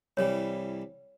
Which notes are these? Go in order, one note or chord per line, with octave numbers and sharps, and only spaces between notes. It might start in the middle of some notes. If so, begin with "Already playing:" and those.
C2 E3 G3 C#5